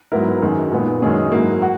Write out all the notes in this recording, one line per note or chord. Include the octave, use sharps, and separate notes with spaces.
G#2 F#3 B3 E4 A#4
F#2 D#3 G#3
A#2 G#3 B3 D#4
F#2 D#3 G#3 C#4 G#4
G#2 F#3 A#3 E4
F#4